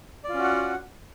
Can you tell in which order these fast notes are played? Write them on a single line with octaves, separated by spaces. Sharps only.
D5 F4 C#4 F#4 F#5